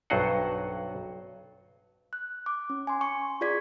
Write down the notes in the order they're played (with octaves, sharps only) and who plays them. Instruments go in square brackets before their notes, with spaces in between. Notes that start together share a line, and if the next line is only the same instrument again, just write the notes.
[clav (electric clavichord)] B1 G2 F#3 C5 D#5 F#5
[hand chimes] F#6
D6
C#4
G#5 C6
C#6
F4 G#4 D5 G#6 B6